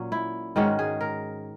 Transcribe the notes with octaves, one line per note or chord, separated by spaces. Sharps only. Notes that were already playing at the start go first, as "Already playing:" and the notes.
Already playing: A#2 F#3 C#4
E4
G#2 D#3 G#3 C#4 F#4
G#4
A#4